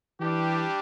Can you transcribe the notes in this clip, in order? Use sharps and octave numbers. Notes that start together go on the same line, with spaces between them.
E3 G3 D4 G4